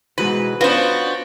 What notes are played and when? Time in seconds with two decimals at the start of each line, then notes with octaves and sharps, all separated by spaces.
0.18 G#2 B2 E3 G#3 F#4 B4 C5
0.61 B3 C#4 D4 F4 F#4 B4 C5